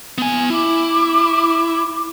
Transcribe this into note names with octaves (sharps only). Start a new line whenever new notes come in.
B3 G#5
E4 D6